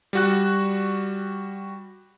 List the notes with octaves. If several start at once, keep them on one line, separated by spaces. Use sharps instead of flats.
G3 F#4 F#6